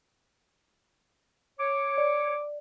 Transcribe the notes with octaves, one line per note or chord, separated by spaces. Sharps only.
C#5 D6
D5